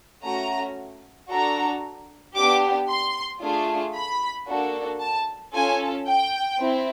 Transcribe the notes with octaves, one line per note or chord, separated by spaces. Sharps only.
A3 C#4 F#4 A#5
D4 F#4 A4 A#5
B3 D4 G4 D6
C6
A3 D4 F4 G#4
B5
A#3 D4 F#4 A4
A5
C#4 F4 A4 G#5
G5
C4 E4